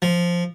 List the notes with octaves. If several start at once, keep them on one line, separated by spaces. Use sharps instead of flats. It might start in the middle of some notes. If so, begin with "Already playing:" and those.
F3